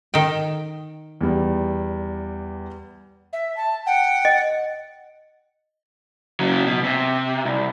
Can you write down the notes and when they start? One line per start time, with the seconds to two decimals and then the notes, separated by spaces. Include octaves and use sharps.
0.14 D#3 G5
1.21 E2 G3
3.33 E5
3.57 A5
3.86 F#5 G5
4.25 D#5
6.40 C#3 F#3
6.66 B2
6.84 C3
7.45 C2